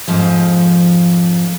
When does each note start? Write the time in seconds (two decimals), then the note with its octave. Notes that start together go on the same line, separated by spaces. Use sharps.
0.08 F2 G#2 F3